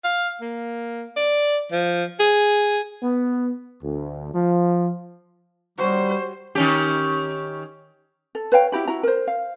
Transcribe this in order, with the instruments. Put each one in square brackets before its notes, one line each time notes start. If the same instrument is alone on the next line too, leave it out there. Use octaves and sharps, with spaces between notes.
[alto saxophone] F5
A#3
D5
F3
G#4
[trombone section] B3
D2
F3
[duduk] G3 [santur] F#4 G4 C#5 [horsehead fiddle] C5
[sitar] D#3 C#4 G4
[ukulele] A4
B4 C#5 F5 G5
E4 F#4 G4 B5
E4 F#4 A#5
A#4 C5
F5